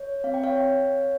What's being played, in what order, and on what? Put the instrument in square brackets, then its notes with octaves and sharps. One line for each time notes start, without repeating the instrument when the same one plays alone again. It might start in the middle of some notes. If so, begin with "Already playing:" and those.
Already playing: [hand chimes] C#5
C4 F5
G5
C#5 F5